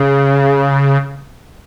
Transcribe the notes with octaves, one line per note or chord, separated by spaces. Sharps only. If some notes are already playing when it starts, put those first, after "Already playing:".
Already playing: C#3